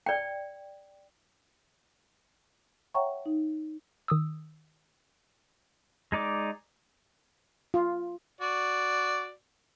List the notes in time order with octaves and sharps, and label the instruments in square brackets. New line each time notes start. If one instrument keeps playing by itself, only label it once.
[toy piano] D5 G5
[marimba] C#5 E5 F#5 G5 A#5 C#6
D#4
[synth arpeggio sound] D#3 D#6 E6
[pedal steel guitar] G#3 D#4 D5 D6
[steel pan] F4
[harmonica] F#4 D5